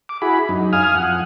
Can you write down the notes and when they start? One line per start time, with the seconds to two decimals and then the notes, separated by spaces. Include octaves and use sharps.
0.09 D6
0.22 E4 F#4 G#4 B5
0.49 F#2 D#4
0.73 F5 G#5 D#6 F6
0.95 F2 F#5